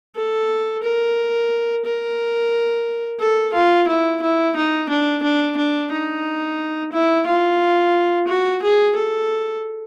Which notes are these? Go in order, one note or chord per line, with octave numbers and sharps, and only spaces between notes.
A4
A#4
A#4
A4
F4
E4
E4
D#4
D4
D4
D4
D#4
E4
F4
F#4
G#4
A4